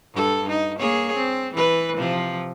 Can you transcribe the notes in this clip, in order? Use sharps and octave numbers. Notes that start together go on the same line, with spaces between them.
G2 A4
D#4
A#3 G#4 C#5
C4
E3 B4
C3 F3